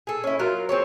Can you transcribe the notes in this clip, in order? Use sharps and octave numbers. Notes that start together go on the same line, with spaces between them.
G#4 A4
C#4 E4
F#3 F4 A#4
C4 G#4 C#5